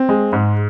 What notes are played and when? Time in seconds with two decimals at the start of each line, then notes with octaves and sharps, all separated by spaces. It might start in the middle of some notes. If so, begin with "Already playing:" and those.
Already playing: C4
0.09 G#3
0.33 G#2